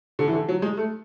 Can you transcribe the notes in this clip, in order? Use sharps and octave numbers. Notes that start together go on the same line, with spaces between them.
D3
E3
D3
F#3
G#3
A3